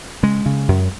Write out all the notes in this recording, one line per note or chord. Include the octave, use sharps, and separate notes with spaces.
C#3 G#3
C#3
F#2